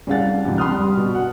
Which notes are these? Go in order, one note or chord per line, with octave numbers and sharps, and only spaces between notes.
C2 C#4 G#4 F5 F#5 A6
F2 G#2 C3
B5 C6 D#6 F6
G3
B2
F#5